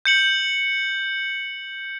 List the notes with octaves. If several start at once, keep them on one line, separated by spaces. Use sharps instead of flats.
G6 C#7 F#7